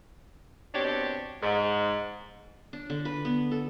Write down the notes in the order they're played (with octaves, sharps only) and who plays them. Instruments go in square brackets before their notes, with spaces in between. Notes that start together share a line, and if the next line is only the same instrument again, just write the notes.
[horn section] B2 C4 D4 G4 C#5
G#2
[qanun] D4
D3
B4
B3
A4